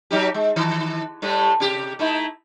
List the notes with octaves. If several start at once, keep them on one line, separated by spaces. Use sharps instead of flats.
F#3 D#4 G4
G#3
D#3
A2 G3 A3
C3 G4
A3 D#4 E4